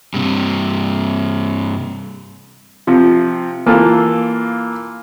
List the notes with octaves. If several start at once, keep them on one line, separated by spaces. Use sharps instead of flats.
G2 C3
C3 F3
E3 A#3 F4 A4